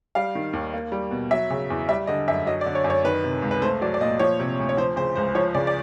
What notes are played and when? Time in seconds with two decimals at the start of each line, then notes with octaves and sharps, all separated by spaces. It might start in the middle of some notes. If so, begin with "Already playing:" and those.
0.15 G3 F5
0.35 D#3
0.53 D#2
0.74 A#3
0.92 G3
1.11 B2
1.31 F#3 E5
1.50 C#3
1.70 E2
1.89 G3 E5
2.07 D3 D#5
2.28 F#2 E5
2.46 F#3 D#5
2.61 D5
2.66 D3
2.75 C#5
2.84 F#2
2.90 C#5
3.04 D#3 B4
3.24 C3
3.42 C#2
3.51 B4
3.61 A3 C5
3.81 F#3 D5
3.94 D5
4.01 A#2 D#5
4.19 F3 C#5
4.40 C3
4.59 D2
4.69 C#5
4.77 F3 C5
4.96 C#3 C5
5.16 C#2 C5
5.35 F3 C#5
5.54 C#3 D5
5.67 D5